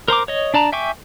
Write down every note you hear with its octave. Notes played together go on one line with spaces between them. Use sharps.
A#4 C5 A#5 D6
C#5 D#5
D4 D5 A5 A#5
E5 G5 G#5 C#6 D6